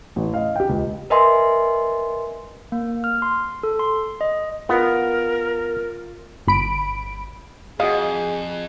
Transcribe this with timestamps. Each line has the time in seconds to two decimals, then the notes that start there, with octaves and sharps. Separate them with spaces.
0.16 A1
0.34 D#5 F5
0.56 G4 G5
0.69 C#2
1.10 A#4 B4 D#5 E5 G#5 C6
2.72 A#3
3.04 F6
3.22 C6
3.63 A4
3.79 C6
4.21 D#5
4.69 B3 F4 A#4
6.47 G1 B5 D7
7.80 F2 F#4 G#4 D#5 F5